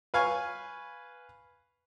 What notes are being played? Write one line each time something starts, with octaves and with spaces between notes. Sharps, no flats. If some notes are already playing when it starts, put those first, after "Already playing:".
B4 F5 G#5 C#6